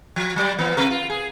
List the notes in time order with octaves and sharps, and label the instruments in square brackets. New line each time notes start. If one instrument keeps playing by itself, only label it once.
[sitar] F3
F#3 G3 D5
A#2 E3 B3
C3 A#4 B4
F4
G#4